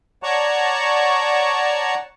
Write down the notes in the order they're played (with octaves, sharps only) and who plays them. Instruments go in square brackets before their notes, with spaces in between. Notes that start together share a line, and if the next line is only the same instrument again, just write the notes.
[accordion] C#5 D5 F#5 A5 A#5 C#6